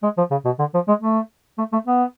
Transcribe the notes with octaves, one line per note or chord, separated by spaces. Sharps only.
G#3
F3
C#3
B2
D3
F3
G#3
A3
A3
A3
B3